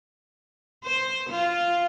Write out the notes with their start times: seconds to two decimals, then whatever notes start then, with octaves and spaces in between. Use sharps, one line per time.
0.84 C5
1.29 F4